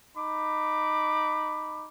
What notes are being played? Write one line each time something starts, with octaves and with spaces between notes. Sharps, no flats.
D#4 B5 D6